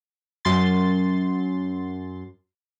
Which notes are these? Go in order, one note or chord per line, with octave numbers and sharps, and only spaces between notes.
F#2 C6 A6